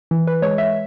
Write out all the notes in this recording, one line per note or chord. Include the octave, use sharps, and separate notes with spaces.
E3
B4
G#3 C#5
E5